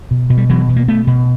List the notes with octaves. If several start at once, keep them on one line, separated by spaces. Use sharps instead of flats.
B2
B2
G3
B2 E3 F#3
B2
A#3
B2 A3 B3
B2